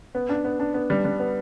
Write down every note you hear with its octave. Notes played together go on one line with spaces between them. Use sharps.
B3
D4
B3
D4
B3
G3
G3
B3